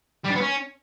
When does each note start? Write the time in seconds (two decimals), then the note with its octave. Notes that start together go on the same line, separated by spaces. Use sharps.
0.24 G3
0.30 D4
0.35 B3
0.41 C#4